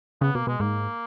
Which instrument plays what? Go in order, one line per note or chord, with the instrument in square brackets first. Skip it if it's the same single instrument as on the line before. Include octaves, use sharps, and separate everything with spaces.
[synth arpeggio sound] C#3 [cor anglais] B3
[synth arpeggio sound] B2 [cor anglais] A#3
[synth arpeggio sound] B2 [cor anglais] G#3
[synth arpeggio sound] G#2 [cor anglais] A#3